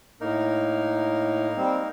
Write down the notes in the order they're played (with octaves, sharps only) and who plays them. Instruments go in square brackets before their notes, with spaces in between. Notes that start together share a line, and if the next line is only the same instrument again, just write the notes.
[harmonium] A2 [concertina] A#3 D#4 A#4
[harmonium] G3 C4